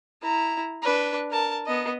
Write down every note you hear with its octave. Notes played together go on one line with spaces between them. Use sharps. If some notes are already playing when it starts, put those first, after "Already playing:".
E4 A#5
D4 B4
A#4 A5
B3 D#5